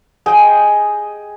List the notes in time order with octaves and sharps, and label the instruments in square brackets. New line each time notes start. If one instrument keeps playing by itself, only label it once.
[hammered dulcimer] G#4 D#5 G5